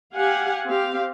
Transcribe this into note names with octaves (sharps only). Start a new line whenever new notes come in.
G4 F5 F#5 G#5
C4 G4 F5